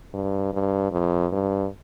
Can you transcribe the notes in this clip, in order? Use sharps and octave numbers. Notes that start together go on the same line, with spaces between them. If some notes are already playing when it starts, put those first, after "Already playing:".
G2
G2
F2
G2